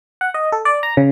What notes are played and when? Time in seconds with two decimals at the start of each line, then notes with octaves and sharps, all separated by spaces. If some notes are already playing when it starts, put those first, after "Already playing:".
0.21 F#5
0.34 D#5
0.52 A4
0.65 D5
0.83 A#5
0.97 C#3